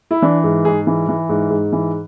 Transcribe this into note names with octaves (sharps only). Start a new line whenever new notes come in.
E4
E3 D4
G#2
G#2 G#4
E3
E3
G#2
G#2
E3